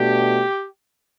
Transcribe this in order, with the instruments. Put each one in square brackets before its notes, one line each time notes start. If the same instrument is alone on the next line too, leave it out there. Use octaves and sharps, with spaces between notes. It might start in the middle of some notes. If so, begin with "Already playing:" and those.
Already playing: [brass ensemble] B2 A3 D4 G4